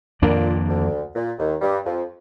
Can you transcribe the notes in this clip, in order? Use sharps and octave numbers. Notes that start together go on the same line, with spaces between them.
F2 A#2 D#3 A#3 D4
D2 D3
A#2
D#2 D#3
G2 G3
F2 F3